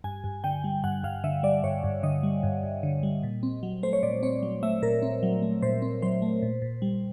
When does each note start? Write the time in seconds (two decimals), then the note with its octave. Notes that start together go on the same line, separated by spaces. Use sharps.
0.04 G2 G#5
0.24 G2
0.44 D3 G5
0.64 G3
0.84 G2 F#5
1.03 G2 F5
1.24 D3 E5
1.43 G3 D5
1.64 G2 C#5
1.84 G2
2.03 D3 D#5
2.23 G3
2.43 G2
2.63 G2
2.83 D3
3.03 G3
3.23 A#2
3.43 C4
3.63 F#3
3.83 A3 C5
3.93 C#5
4.03 A#2 D5
4.23 C4 C#5
4.43 F#3
4.63 A3 E5
4.82 A#2 A#4
5.02 C4
5.23 F#3
5.42 A3
5.62 A#2 C5
5.82 C4
6.02 F#3 C5
6.22 A3
6.42 A#2
6.62 A#2
6.82 G3